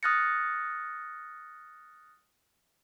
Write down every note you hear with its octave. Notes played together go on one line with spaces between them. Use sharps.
D#6 F6 F#6 A6 A#6 C#7